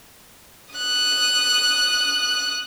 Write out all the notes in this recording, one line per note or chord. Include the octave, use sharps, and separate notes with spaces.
D#6 F#6